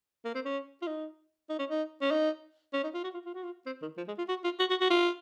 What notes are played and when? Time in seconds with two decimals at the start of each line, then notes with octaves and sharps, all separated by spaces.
0.25 A#3
0.35 C4
0.45 C#4
0.82 F4
0.87 D#4
1.49 D#4
1.59 C#4
1.70 D#4
2.01 C#4
2.11 D#4
2.74 C#4
2.84 D#4
2.94 F4
3.04 F#4
3.14 F4
3.25 F4
3.34 F#4
3.44 F4
3.66 C4
3.82 D#3
3.97 F3
4.08 G#3
4.18 F4
4.29 F#4
4.44 F4
4.60 F#4
4.70 F#4
4.81 F#4
4.90 F4